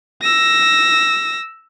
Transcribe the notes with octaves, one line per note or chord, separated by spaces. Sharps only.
E6 A#6